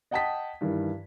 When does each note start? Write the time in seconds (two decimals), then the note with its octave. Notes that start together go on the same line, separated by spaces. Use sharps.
0.11 D#5 F#5 G5 A5 D#6 B6
0.61 G2 D#3 E3